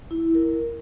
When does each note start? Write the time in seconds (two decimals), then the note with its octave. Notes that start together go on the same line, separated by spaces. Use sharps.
0.11 E4
0.35 A#4